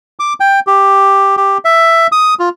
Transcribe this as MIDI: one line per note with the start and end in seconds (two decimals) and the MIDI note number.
0.20 0.33 86
0.40 0.60 79
0.67 1.36 67
1.37 1.58 67
1.65 2.07 76
2.12 2.34 87
2.39 2.49 65